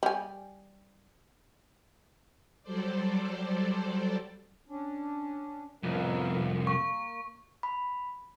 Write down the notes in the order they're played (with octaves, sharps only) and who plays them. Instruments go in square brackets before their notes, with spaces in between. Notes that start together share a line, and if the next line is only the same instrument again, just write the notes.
[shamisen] G3 G#5
[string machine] F#3 G3 A4 C5 D5
[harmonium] C#4 D4
[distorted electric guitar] C2 F2 [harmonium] B3 A#4 E5
[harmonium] A#3 [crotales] C#6
[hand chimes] B5